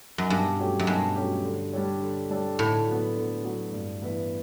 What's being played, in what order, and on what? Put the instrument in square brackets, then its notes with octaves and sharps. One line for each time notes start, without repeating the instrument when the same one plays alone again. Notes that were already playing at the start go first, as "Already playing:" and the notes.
[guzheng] F#2
[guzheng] G2 [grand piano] B2
[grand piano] F#3 A3 C#4 G4
[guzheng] F#2
[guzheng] G2 [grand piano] B2
[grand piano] F#3 A3 C#4 G4
D3
G3 D4 A4 C#5
D3
G3 D4 A4 C#5
[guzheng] A2 [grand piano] D3
[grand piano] F#3 B3
D3
F#3 B3
G2
E3 B3 E4 B4